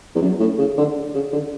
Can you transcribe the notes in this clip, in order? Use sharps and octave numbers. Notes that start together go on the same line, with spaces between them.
E2
F#2
A2
C#3
D3
C#3
D3